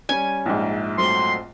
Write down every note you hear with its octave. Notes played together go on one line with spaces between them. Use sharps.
G3 C#4 G#5
A#1 G#2
F#3 A3 C4 C6